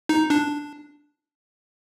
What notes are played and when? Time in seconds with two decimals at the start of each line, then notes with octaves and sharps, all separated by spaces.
0.09 D#4
0.30 D4